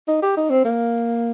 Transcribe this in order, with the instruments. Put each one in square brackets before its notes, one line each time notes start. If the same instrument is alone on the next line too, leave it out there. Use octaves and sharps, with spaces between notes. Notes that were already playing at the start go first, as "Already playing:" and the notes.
[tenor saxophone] D#4
G4
D#4
C4
A#3